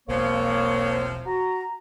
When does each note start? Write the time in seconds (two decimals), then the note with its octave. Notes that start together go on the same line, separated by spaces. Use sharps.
0.08 E1 B1 A2 C3 F3 A#3 C#5
1.26 F#4 A#5